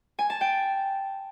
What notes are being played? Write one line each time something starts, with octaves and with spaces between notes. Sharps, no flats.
G#5
A5
G5